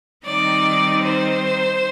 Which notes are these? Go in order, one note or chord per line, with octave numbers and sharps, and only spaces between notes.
D#3 G3 C4 D#4 D5
C5